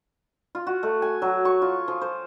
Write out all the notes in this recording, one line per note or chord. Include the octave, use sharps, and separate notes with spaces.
F4
F#4
A3
G#5
F#3
C#6
F4
F3
C5